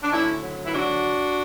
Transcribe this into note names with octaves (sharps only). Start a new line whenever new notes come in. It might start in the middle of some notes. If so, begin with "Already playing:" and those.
D4
D2 C#4 E4
F#3
E4
D2 D4 F#4